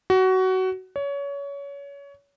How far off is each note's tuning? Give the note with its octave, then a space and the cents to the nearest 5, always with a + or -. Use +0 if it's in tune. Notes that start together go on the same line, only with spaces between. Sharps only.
F#4 +20
C#5 +25